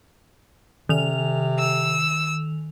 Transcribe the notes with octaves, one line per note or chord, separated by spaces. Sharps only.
C3 D#3 F7
E6